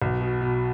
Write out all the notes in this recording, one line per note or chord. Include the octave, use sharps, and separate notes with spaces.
B1
B2
B2